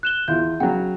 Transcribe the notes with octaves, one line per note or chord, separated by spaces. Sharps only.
F#6 E7 G7
E2 E4 F4 G6
C#3 F#3 F#5 G5